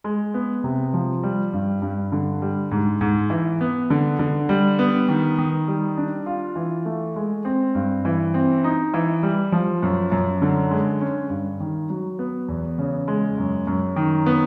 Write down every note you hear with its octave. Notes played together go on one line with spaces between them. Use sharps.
G#3
B3
C3
F3
G3
G2
G2
D3
G3
G#2
G#2
E3
B3
D3
D3
G3
B3
D#3
D#3
G3
D4
F4
E3
A3
G#3
C4
G2
E3
C4
D#4
E3
G3
F3
F#2
F#2
D3
G#3
C#4
G2
D#3
F#3
B3
E2
C#3
G#3
F#2
F#2
D#3
B3